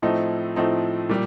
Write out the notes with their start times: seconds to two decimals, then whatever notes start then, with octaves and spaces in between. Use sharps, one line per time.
0.02 A2 F3 A3 C4 D#4
0.56 A2 F3 A3 C4 D#4
1.09 A#2 G3